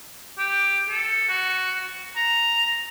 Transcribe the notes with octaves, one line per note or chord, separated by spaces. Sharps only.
G4
A4
F#4
A#5